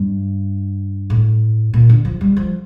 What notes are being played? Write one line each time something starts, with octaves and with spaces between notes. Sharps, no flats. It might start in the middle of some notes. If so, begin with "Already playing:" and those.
Already playing: G2
A2
A#2
D3
F3
G3
F3